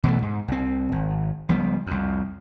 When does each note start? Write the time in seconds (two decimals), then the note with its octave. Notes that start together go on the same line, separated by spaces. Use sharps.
0.04 B2 E3 F3 A3
0.22 G#2
0.48 C2 C4
0.92 G#1
1.49 C#2 F3 G3 B3
1.87 C2 F2